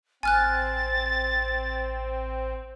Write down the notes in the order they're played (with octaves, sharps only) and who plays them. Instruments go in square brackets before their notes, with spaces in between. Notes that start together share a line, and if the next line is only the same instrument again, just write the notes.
[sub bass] A1 [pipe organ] C4 [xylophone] G#5 F6 F#6 [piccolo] A6